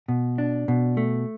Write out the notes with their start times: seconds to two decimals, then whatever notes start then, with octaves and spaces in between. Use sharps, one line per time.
0.08 B2
0.38 D4
0.68 B2
0.97 A3